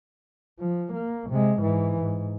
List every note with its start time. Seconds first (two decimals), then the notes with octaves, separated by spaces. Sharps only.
0.60 F3
0.93 A#3
1.30 C3 G#3
1.61 G#2 E3
2.02 G#2